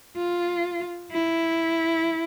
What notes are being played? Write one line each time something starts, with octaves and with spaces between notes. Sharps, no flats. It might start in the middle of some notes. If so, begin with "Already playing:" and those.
F4
E4